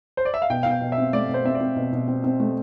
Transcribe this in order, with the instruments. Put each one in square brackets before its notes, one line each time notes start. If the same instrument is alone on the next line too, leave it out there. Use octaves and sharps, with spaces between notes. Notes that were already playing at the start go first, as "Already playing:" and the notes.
[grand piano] C5
D5
E5
F5
[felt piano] B2 [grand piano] G5
[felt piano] B2 [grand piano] F5
[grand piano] G5
[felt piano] B2
[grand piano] E5
[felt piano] C4
[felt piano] A3 [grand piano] D5
[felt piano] B2
[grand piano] C5
[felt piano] C4 [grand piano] E5
[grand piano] D5
[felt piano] C4
B2
B2
C4
C4
A3